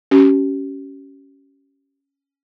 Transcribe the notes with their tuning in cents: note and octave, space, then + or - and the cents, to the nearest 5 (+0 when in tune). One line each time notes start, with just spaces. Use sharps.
C#4 +0 G4 -35